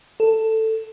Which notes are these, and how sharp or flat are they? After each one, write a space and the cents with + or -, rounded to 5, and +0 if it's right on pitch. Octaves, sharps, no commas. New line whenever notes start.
A4 +10